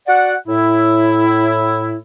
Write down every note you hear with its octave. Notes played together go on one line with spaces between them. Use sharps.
F#4 D5 F#5
A2 E4